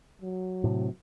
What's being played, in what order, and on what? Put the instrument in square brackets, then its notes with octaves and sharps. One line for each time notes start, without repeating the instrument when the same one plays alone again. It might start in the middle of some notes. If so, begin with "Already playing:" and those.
[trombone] F#3
[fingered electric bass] A2 C3